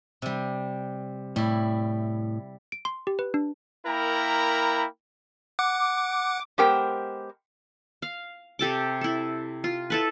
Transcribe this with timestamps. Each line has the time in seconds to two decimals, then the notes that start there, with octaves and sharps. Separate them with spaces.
0.22 C3 G3
1.36 A2 G3 E4
2.72 D7
2.85 C6
3.07 G4
3.19 B4
3.34 D4
3.87 A#3 E4 A#4 G5 A#5 B5
5.59 F#5 D6
6.58 G#3 B3 G4 A#4 C5 G5
8.02 F5
8.59 C3 G4 A4 D6
9.01 E4 A4
9.64 F4
9.90 E4 A4 B4